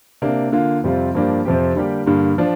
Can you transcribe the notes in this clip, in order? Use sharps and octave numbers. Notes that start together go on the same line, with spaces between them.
C3 A#3 D4
D3 A#3 F4
F2 C3 G3 C4 F4
G2 F3 A#3 D4 G4
F2 C3 F3 C4 G4
D3 G3 A#3 D4 G4
G2 D3 G3 A#3
F3 D4 F4